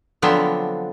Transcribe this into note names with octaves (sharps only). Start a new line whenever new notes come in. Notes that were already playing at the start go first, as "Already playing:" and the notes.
D3 F3 F#3 B3 C4 D4